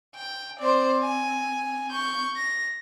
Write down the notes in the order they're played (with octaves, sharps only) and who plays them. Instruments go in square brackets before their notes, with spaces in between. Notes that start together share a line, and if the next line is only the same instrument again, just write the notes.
[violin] G5
[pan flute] C4 [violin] C5 D5
[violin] G#5
C#6 G6
A#6